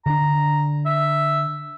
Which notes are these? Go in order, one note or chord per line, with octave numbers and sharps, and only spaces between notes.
D3 D4 A#5
E5